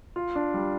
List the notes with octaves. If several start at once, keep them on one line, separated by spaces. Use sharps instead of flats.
F4
D4
G3